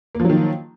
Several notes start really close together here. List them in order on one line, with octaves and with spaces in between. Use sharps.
A#3 F3 F#3 D#3